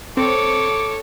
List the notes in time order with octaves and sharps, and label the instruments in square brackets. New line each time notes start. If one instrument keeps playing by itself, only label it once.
[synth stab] C4 [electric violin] A4 C#5 [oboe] D6